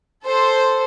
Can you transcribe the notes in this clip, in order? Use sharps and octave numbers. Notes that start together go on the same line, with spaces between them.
A4 C5